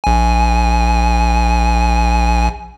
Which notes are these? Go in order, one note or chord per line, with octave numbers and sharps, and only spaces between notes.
A#1 G#5